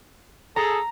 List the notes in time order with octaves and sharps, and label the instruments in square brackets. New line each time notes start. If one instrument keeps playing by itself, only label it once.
[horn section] G#4 A4 [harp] A#5